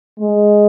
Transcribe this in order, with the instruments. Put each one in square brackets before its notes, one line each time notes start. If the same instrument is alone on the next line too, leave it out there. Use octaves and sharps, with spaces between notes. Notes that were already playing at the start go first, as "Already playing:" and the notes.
[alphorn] G#3